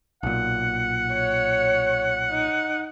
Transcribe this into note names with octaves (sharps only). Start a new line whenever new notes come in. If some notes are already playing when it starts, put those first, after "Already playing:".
B1 A#2 F#5
C#5
D#4